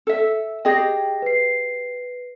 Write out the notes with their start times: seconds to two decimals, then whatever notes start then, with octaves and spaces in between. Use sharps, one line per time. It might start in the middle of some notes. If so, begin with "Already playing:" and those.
0.07 A4 E5
0.65 G4 G#4 D#5 G5 A#6
1.22 B4 C7